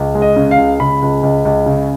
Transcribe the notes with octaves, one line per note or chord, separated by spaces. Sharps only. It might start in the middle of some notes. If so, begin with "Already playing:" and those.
Already playing: C#2
G#3
D#5
C#3
F5
C#2
C#3 B5
C#2
C#2
C#2
C#3